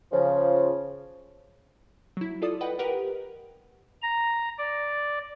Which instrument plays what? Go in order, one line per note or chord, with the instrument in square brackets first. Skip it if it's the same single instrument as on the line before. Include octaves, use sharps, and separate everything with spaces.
[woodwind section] C#3 F3
[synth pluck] F#3 E4
F4 A4 D5 D#6
B4 D#5 F#5 G5 B5
G4 A#4 B4 F#5 G5
[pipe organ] A#5
D5